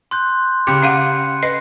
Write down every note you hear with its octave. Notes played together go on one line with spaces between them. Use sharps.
C6 F#6 G6
C#3 G4 B5 D6 F#6 C#7
C#4 F5 F#5
B4 D#5 A#6